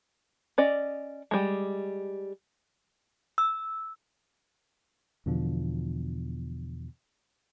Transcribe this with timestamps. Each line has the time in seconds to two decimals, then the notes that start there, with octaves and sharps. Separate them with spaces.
0.58 C#4 D5 D#5
1.31 G3 G#3
3.38 E6
5.26 E2 B2 D3 F3